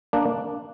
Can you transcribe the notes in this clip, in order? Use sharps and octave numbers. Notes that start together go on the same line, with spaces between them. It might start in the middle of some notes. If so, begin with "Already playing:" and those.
A#3 D4